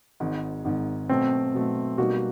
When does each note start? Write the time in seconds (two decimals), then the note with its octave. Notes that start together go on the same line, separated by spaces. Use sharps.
0.20 G#1 G#2 D#3
0.65 G#1 G#2 D#3
1.09 B2 F#3 A3 C4
1.54 B2 F#3 A3
1.98 B2 G3 A#3 D#4 F#4